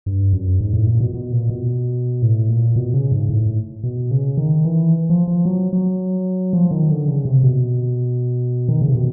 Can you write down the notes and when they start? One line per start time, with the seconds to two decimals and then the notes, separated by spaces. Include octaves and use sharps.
0.06 G2
0.33 F#2
0.60 G#2
0.74 A2
0.87 A#2
1.00 B2
1.14 B2
1.32 A#2
1.50 B2
2.22 A2
2.49 A#2
2.76 B2
2.94 C#3
3.12 G#2
3.30 A2
3.83 B2
4.11 C#3
4.37 D#3
4.64 E3
5.10 F3
5.27 F3
5.45 F#3
5.73 F#3
6.53 F3
6.71 D#3
6.89 D3
7.07 C#3
7.25 C3
7.43 B2
8.69 D#3
8.82 C#3
8.88 C3
8.95 B2